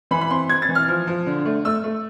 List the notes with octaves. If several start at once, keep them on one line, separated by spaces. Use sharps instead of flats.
E3 B5
B5
C4 C6
C4 G#6
A6
E3
F6
F3
F3
D3
A3
A3 E6
A3